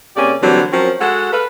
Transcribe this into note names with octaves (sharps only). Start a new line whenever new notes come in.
C3 A#3 C#4 G4 G#4 D5
D3 E3 F#3 G3 A#3 C4
F3 F#3 C4 C#4 A#4
G#3 F#4 A4 F#5
A4 B4 F5